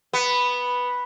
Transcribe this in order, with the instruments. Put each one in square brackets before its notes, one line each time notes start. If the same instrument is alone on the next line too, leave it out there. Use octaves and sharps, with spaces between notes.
[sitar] B3